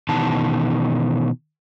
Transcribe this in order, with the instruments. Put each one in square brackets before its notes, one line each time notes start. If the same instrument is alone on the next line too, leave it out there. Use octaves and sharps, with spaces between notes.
[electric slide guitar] B2 D#3 E3 A5